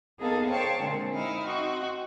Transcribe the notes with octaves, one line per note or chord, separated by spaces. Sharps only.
A#3 B3 D#4 G#4 A4 F5
C5 C#5 F5 G5 A5 C6
A#2 D3 G#3 C4 D4
D#4 E4 F5
C4 D#4 F#4